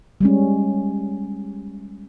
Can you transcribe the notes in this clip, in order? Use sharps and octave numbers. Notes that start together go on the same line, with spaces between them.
G3 G#3 C#4